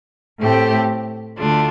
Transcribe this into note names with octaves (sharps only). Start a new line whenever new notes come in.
A2 A3 C4 G4
D2 D3 A3 D4 F4